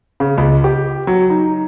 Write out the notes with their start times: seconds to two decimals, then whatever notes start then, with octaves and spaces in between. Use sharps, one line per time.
0.20 C#3
0.38 C#2
0.64 G4
1.07 F#3
1.30 D#4